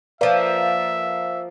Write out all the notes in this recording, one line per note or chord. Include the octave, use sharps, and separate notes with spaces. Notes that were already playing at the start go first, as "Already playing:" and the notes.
F3 A#3 B4 D5 E5 F5